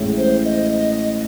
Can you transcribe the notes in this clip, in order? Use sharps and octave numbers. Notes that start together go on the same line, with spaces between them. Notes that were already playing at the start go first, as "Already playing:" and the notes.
Already playing: A1 A2 G#3
C5
D#5